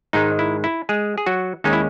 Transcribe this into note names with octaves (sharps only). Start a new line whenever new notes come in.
G#2 D#3 G#3 D#4
E4
E4
G#3 G#4
G#4
F#3 F#4
D#2 D#3 G#3 C#4 D#4
E4